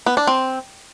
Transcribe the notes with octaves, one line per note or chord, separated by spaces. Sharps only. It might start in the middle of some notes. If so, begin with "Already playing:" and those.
B3
D4
C4